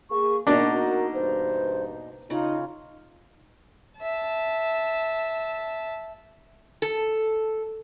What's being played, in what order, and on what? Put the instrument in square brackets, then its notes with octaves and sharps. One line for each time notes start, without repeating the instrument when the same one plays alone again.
[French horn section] A#3 G#4 [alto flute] C#6
[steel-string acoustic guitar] B2 A#3 D#4 [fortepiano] D4 [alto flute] F#4 [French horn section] A#4
[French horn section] E2 G2 B4 [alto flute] C5
[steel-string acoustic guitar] C#3 [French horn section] D#4 [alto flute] F4
[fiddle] E5 A5
[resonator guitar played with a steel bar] A4